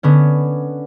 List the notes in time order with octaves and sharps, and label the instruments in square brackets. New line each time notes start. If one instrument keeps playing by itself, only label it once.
[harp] D3 B3 C#4